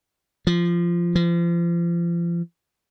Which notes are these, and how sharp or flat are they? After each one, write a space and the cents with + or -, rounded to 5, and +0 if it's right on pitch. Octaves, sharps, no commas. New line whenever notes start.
F3 -15
F3 -35